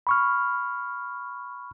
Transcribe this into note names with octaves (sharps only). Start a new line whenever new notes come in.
B5 C#6 F6